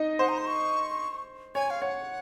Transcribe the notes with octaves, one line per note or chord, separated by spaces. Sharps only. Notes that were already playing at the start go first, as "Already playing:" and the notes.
Already playing: D#4 D#5
C5 F#5
A#5
C6
C#6
C#5 G#5
F5
C#5 F#5